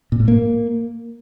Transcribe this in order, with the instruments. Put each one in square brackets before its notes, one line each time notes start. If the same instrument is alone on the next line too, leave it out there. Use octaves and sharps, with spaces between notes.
[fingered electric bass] A#2
A2
A#3